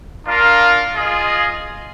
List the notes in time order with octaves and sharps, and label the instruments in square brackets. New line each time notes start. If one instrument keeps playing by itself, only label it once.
[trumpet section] D4 F4 A#4 F5
F4 G#4 D#5